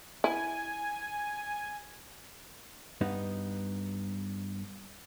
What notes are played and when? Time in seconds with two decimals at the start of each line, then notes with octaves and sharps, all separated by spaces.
0.24 E4 G#5
3.01 G2 B3 D#4